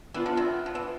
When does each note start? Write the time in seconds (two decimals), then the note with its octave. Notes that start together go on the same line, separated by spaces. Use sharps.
0.14 E3 B3 D4 F4
0.26 D3
0.37 C3
0.66 F3
0.75 E3